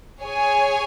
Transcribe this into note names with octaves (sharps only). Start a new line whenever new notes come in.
G#4 C#5 G#5